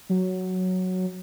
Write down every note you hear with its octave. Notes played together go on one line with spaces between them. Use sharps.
F#3